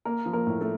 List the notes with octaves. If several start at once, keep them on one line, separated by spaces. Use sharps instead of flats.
A#3 A#4
F3
A#3 A#4
A2
A3 A4